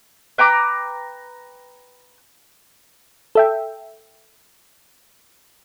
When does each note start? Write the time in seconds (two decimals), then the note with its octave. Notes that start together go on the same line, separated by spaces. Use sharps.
0.38 B4 G5 A#5 D6
3.35 A4 E5 G5